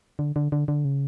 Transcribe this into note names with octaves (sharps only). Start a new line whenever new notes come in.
D3
D3
D3
D3
C#3